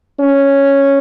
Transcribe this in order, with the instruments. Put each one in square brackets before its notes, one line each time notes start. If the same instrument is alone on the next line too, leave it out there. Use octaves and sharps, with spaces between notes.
[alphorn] C#4